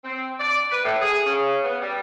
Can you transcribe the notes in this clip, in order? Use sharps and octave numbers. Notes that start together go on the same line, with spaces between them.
C4
D5
B4
A2
G#4
C#3
B3
G3